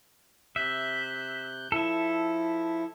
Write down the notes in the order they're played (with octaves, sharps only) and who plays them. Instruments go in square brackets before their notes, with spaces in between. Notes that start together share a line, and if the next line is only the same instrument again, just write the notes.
[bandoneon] C3 F#6 G6 [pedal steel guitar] E5
[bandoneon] F3 E4 [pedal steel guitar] A4 E5